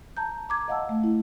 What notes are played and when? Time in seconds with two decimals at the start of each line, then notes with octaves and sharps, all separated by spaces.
0.17 A5 A#5 G6
0.49 A#5 D6 G#6
0.68 D#5 F5 F#5 A5 E6
0.89 A3
1.04 E4